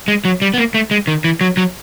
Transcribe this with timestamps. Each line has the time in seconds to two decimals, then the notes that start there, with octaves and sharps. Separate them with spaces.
0.08 G#3
0.25 F#3
0.42 G3
0.54 B3
0.58 A#3
0.74 A3
0.91 G#3
1.07 D#3
1.24 E3
1.41 F#3
1.57 F#3